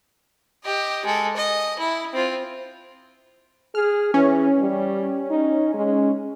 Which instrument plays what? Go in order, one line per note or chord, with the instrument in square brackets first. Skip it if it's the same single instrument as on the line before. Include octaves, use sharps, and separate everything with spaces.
[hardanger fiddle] G4 D#5
G#3 A4
D#5
E4
C4 F4
[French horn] G#4 [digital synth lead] F6
[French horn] E3 [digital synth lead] C#4
[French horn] G3
D#4
G#3